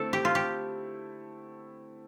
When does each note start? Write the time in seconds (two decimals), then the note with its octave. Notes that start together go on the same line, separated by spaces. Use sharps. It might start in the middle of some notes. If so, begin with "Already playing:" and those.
Already playing: D3 A3 C4 E4 A4
0.13 G4
0.25 F4
0.35 G4